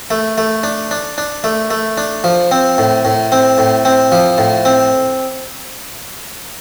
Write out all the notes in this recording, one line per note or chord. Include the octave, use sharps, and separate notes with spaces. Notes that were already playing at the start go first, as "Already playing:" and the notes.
A3
A3
D4
D4
D4
A3
A3
D4
F3
C4
A2
A2
C4
A2
C4
F3
A2
C4